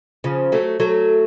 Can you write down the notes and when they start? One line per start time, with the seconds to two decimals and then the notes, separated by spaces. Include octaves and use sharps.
0.24 C#3 F3
0.52 F#3 A3
0.80 F#3 A3